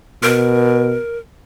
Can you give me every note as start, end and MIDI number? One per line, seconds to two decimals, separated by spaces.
0.23 0.96 47
0.23 1.18 70